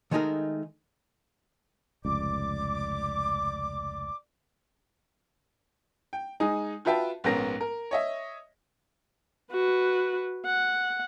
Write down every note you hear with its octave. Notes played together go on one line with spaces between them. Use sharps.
D#3 G#3 A3 D#4 G#4 A#4
F1 C#2 D5 D6
G5
G#3 D#4 G#5 D#6
F4 F#4 B4 E5 G5 A5
A#1 G#2 B3 C#4 A#4 A#6
A#4
C#5 D#5 E5
F#4 B4
F#5